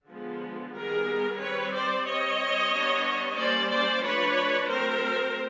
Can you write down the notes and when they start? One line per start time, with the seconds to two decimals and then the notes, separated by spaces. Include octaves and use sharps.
0.09 D3 F3 G#3 B3
0.74 D#3 G3 B3 G#4 A#4
1.39 G3 C4 B4 C#5
1.73 C5 D5
2.05 G3 C4 C#5 D#5
2.72 G3 B3 D4
3.37 G3 A#3 C#4 C5 D5
3.70 C5 D5
4.03 F3 A3 D4 B4 C#5
4.69 F#3 A3 C4 A#4 C5